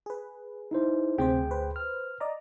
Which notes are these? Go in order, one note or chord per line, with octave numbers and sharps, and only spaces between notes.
G#4 B4
D#4 E4 C5
D2 C3 C4 G#4 C5 G5
B4 C5
F6
D5 D#5 A#5